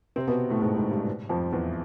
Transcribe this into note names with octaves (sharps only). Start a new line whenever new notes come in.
C3 C4
B2 B3
A2 A3
G#2 G#3
G#2 G#3
G2 G3
F2 F3
E2 E3